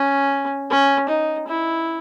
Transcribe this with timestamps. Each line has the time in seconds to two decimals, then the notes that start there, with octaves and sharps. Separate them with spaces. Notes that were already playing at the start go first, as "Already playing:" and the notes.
Already playing: C#4
0.70 C#4
1.09 D#4
1.48 E4